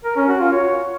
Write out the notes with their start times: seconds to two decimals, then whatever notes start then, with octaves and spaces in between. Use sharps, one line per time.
0.04 A#4
0.16 C#4
0.28 F#4
0.40 F4
0.52 C#5